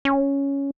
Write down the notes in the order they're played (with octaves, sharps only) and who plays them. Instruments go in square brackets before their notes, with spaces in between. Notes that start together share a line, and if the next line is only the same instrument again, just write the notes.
[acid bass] C#4